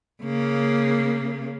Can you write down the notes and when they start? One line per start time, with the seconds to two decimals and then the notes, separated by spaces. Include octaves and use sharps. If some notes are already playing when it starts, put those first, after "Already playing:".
0.23 C#3 A#3